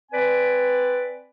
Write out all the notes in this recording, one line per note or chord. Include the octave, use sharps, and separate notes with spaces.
C4 B4 D5 G#5